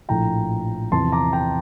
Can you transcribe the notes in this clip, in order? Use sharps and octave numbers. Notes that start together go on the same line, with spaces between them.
A#1 A2 F3 G5 A#5
E2 C3 F3 A5 C6
A#5 D6
G5 A#5